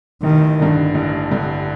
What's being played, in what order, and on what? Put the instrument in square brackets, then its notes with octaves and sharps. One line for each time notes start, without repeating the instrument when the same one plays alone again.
[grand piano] A1 [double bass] D#3
[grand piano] G2 D3
A1
G2 D3